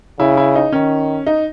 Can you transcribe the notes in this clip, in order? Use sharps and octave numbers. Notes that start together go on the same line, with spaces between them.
C#3 E4
E4
D#4
D#3 C#4
D#4